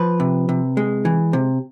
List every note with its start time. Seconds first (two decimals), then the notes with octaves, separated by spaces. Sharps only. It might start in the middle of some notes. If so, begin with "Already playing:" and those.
Already playing: F3 B4
0.20 C3
0.49 C3
0.77 G#3
1.05 E3
1.33 C3